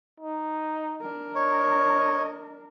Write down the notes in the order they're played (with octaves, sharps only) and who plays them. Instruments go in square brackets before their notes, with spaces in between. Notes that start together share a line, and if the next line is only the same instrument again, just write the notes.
[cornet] D#4
[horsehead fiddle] D4 A#4
[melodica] C#5 [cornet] D#5